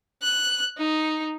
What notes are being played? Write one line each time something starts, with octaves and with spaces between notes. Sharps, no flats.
F#6
D#4